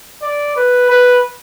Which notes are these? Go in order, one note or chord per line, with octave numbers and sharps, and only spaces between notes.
D5
B4
B4